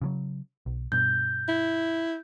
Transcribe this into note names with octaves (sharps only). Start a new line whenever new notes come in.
C#3 E3 F#3
B1
G2 B2 G6
E4